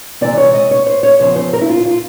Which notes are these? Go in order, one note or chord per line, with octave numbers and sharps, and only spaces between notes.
C3 E3 G#3 C4 D5
C#5
D#5
C#5
C5
C#5
E2 C#3 F3 C5
C5
A#4
E4
F4
F4